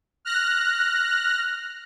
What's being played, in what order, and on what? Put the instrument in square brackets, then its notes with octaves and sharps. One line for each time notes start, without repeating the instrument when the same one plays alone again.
[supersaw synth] F6 F#6 A#6